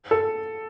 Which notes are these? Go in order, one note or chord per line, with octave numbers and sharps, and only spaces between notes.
A4